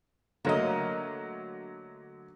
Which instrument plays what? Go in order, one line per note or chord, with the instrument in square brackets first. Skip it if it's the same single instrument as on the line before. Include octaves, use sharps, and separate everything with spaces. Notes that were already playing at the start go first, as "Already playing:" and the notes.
[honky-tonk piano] D3 F#3 A3 [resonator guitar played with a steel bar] A#3 D#5